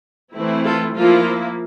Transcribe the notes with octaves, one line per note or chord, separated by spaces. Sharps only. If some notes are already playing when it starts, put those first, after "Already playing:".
E3 A3 C4 E4
F4 A4
F3 A#3 E4 F4